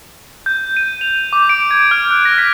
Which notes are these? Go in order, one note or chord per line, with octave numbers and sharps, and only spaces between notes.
G6
D#7
F7
D6
D7
G#6
F6
F#6
A#6
B6